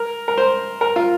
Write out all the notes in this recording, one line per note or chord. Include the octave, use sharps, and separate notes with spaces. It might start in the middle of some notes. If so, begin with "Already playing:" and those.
Already playing: A#4
A#4
C5
A#4
F4